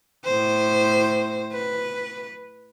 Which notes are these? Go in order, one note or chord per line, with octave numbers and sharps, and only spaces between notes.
A2 C5
B4